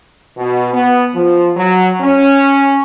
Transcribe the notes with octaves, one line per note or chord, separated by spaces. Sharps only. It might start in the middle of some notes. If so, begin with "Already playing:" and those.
B2
B3
F3
F#3
C#4